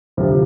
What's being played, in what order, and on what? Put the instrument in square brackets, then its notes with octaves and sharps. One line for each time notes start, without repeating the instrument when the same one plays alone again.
[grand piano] D2 C3 F3